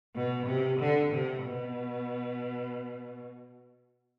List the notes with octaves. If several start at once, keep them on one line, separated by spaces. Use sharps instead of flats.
B2
C3
D3
C3
B2